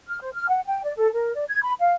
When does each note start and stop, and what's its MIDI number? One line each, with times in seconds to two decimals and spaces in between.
0.08 0.20 89
0.21 0.29 72
0.33 0.48 89
0.49 0.60 78
0.65 0.82 79
0.83 0.93 74
0.97 1.08 69
1.14 1.32 70
1.35 1.44 74
1.49 1.61 92
1.63 1.73 83
1.80 1.94 77